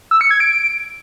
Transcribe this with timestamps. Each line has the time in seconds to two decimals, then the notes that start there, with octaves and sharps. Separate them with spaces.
0.11 E6
0.21 C#7
0.31 G#6
0.40 D7